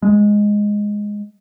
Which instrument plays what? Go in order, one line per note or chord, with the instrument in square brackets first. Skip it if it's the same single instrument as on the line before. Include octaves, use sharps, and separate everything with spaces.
[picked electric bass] G#3